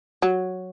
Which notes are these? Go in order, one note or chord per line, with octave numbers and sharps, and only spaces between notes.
F#3